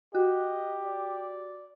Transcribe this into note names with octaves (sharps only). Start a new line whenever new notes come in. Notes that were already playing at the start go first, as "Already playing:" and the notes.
F#4 G4 D#5
D5